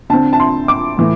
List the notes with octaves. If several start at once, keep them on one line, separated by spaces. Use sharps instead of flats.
D3 C4 A5
A5
C6
D6
A2 E3 A3